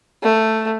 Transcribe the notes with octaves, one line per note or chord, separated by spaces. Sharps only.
A3